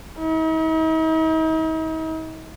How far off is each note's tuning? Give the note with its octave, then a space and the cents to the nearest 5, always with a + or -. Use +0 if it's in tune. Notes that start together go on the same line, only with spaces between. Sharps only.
D#4 +45